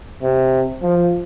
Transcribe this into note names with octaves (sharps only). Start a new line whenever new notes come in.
C3
F3